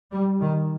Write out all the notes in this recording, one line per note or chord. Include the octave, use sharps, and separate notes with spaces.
G3
D#3